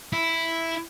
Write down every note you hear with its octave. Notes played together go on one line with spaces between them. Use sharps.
E4